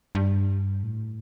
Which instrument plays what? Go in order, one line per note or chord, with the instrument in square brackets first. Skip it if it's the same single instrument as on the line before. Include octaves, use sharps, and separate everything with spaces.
[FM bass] G2
A2